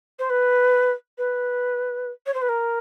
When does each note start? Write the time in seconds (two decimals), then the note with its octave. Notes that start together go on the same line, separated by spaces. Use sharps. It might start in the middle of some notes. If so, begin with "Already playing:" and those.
0.19 C5
0.29 B4
1.17 B4
2.26 C#5
2.34 C5
2.41 B4
2.48 A#4